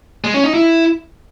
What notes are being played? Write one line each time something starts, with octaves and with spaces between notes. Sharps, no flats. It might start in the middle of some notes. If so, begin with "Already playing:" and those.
G#3
C#4
D#4
E4